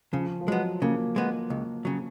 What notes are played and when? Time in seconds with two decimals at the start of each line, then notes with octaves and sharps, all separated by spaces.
0.13 C#3 F3
0.41 F3
0.47 F#3 G#3 B3
0.82 C#3 A#3
1.16 G#3 B3
1.50 C#2
1.85 C#3 F#3